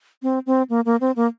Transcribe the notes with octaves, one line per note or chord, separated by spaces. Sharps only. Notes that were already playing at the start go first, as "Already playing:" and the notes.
C4
C4
A#3
A#3
C4
A#3